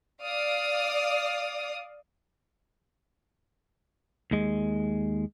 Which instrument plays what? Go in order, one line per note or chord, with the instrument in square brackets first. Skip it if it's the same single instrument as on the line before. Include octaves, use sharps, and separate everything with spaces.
[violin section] D5 F5 D#6
[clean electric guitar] D#2 G#3